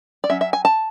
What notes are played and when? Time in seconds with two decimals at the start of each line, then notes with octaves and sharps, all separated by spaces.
0.24 D5
0.30 F#3 C#4 E5
0.41 E5
0.53 G#5
0.65 A5